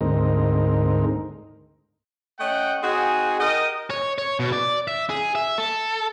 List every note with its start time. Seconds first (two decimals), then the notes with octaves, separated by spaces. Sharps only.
0.01 D2 G#2 C4 D#4 A#4
2.39 A3 C#4 D#5 F#5 G5
2.83 C4 D#4 F#4 G#4
3.40 G4 A#4 D#5
3.90 C#5
4.18 C#5
4.40 B2
4.53 D5
4.88 E5
5.09 G#4
5.35 E5
5.58 A4